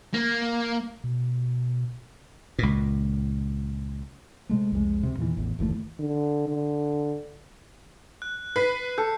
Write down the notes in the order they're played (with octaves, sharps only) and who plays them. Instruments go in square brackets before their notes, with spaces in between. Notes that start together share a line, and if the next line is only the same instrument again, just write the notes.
[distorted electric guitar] A#3
[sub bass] B2
[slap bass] C#2 A#2
[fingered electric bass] C3 G#3 A3
C2 F2 G3 G#3
D2 C3
E2 A#2 D#3 E3
A1 E2
F#1 D#2 E3 A3
[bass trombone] D3
D3
[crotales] F#6
[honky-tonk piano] B4 [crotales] F#6 B6 C7
[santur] A4 [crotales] G6 C#7